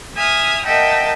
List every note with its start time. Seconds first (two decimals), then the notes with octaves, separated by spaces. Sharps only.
0.17 E5 G#5 D#6 F6
0.65 A#4 D#5 E5 F#5 G5 A5